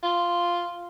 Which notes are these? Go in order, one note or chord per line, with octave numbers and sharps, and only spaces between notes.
F4